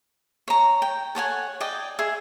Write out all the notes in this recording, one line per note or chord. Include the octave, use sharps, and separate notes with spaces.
C#5 A#5
G5
A4 C#5 F#5 G#5
D5 D#5 G5
G#4 E5